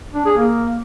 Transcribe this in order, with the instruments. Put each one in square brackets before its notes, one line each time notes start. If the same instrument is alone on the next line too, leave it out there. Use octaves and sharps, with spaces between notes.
[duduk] D4
G#4
A#3